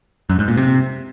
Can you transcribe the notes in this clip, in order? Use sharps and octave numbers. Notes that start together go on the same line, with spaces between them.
F#2
G#2
A#2
C3